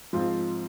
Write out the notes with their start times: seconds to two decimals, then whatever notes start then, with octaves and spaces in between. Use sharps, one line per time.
0.13 G#2 F3 C4 F4